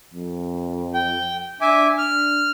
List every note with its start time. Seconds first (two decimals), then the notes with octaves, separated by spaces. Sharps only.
0.13 F2
0.94 G5
1.61 D4 E5 G#5 D6
1.98 D4 F6